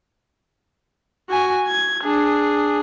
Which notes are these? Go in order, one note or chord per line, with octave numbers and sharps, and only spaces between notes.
F#4 G#5
G#6
D4 G#4